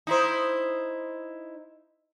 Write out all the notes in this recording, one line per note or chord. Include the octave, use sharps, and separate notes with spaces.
D#4 E4 C5